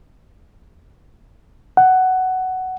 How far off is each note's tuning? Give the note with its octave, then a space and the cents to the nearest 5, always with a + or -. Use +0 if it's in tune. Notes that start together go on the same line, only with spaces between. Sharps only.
F#5 +10